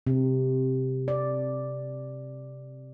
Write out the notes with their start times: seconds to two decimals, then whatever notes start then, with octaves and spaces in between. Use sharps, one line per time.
0.07 C3
1.08 D5